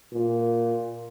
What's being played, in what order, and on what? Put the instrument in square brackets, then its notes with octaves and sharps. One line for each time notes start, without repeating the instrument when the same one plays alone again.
[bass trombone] A#2